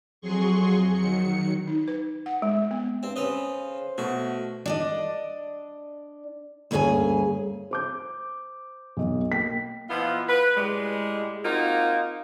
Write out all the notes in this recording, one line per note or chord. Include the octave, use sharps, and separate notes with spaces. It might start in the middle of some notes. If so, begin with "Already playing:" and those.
F2 F#3 G#4 C6 C#6
D#3 F#3 C#7
D#4
B4
F#5
G#3
B3
G2 C4
C#3 B4 C5 D#5
B2 A3 F#4
D4 D5 D#5
D2 G2 A#3 C#4 G#4 G#5
C5 D6 G6
B1 D#5
A#3 G5 B6
B2 F3 B3 E4 F4
B4
A2 G3 G#3
A#3 C4 D#4 F4 F#4